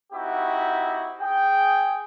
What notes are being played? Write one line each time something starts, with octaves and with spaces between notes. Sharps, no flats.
C4 D#4 E4 F#4 G4
G#4 G5